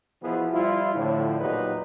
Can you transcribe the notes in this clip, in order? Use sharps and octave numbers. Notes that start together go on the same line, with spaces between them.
B2 E3 F3 B3 E4 G#4
F3 G3 E4 F4
A2 D3 F3
E2 A#2 F#3 D#4 G4 B4